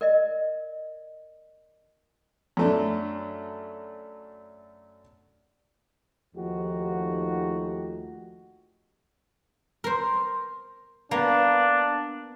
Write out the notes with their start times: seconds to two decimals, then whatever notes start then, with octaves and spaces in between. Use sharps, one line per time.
0.01 A#4 D5 D#5
2.57 F#2 A3 D4
6.35 D#2 F3 A3 D#4 F#4 G4
9.84 A#4 C5
11.11 A#3 B3 D4